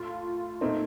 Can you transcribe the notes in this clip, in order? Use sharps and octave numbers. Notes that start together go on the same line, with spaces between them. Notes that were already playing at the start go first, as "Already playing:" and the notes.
Already playing: A2 F4
A#2 A3 C4 D#4